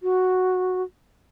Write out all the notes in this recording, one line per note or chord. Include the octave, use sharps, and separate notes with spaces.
F#4